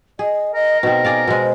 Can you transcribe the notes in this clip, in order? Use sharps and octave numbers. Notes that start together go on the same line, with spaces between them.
G#4 D#5
A#4 D#5
B2 C4 D#4
G#4 D5 F5
B2 G#3 C5